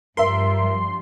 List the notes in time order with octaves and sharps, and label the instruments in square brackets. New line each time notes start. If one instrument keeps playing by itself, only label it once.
[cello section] G2 F3 G3 [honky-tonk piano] A#4 E5 [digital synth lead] C6